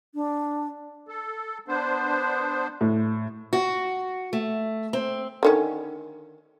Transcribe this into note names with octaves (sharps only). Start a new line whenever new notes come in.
D4
A4
B3 D4 C5
A2
F#4
A3
C4
D3 D#3 C#4